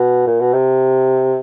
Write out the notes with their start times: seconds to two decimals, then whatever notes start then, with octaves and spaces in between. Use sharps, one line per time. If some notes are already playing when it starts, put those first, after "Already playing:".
Already playing: B2
0.27 A#2
0.40 B2
0.53 C3